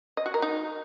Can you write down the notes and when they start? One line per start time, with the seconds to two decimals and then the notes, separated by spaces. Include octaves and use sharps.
0.17 D#5
0.26 F#4
0.34 A#4
0.42 D#4